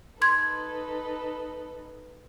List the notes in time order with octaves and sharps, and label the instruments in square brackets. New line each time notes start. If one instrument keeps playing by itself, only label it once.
[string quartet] D#4 A4 B4 [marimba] C6 G#6